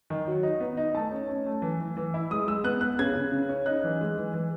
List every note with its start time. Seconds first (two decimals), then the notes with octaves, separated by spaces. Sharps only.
0.10 D#3
0.27 F#3
0.43 D#4
0.60 B3
0.77 D#4
0.94 A3 A5
1.11 C#4
1.29 C#4
1.46 A3
1.62 E3
1.80 E3
1.97 E3
2.14 E4
2.31 G#3 D#6
2.48 G#3 E6
2.64 B3 F#6
2.81 B3 F#6
2.99 C#3 G#6
3.15 C#3
3.32 C#3
3.49 C#4
3.66 D#4 F#6
3.84 E3
4.01 G#3
4.17 E3
4.34 E3